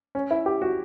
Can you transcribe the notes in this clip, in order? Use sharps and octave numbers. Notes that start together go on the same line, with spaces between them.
C#4
E4
G4
F#4